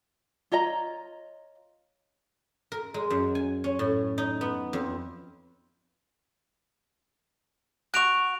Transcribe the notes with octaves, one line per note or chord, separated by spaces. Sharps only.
F4 C#5 D#5 A#5
A#4
G#3
F#2
G#5
C#4
A2
D#4
B3
F2
F#4 C#6 F#6 D7 F7